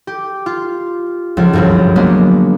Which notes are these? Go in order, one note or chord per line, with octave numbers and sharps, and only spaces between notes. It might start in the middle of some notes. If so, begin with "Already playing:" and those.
G4
F4
C#2 F3
G1 C2 F#2
F#3 G#3 A#3 B3 D4